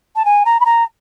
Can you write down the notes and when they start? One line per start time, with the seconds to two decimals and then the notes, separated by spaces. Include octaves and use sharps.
0.16 A5
0.25 G#5
0.45 A#5
0.60 B5
0.65 A#5